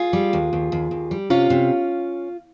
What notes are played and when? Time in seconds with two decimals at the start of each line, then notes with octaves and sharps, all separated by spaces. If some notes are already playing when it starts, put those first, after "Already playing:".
Already playing: F4 G#4
0.13 G3
0.33 D#2
0.53 D#2
0.72 D#2
0.91 D#2
1.11 G3
1.30 C3 C#4 F4
1.50 C3